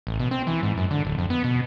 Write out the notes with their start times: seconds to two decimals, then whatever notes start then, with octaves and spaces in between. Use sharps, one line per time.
0.07 A1
0.20 B2
0.31 C4
0.47 E3
0.63 G#2
0.77 F#2
0.91 D3
1.05 D1
1.18 F2
1.30 B3
1.44 B2